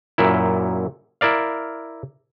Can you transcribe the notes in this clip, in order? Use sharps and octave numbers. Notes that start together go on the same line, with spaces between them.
F#2 A#2 E4
E4 A#4 D5 F5